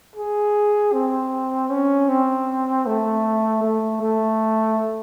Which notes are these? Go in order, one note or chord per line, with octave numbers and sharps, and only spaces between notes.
G#4
C4
C#4
C4
A3
A3
A3